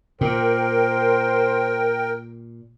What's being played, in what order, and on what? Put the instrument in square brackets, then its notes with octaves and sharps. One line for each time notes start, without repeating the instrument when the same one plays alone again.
[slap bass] A#2 [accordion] A#4 G5 [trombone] C5